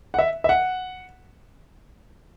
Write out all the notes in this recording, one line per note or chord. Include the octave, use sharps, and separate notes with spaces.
F#5
E5
E5
F#5